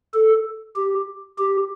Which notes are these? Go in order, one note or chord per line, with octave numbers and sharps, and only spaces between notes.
A4
G4
G4